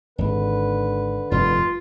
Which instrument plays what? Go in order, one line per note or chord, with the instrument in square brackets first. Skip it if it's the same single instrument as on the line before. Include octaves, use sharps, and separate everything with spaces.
[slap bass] G#1 [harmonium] D3 B4
[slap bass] F1 G2 [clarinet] F4